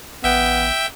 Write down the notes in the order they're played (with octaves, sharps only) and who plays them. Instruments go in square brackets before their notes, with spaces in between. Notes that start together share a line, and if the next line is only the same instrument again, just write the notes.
[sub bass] A1 [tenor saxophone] B3 [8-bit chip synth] E5 G5